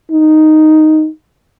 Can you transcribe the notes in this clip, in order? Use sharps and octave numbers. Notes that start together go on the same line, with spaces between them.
D#4